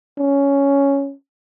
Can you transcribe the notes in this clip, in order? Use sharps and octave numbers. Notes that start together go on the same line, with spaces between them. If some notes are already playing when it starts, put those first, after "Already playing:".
C#4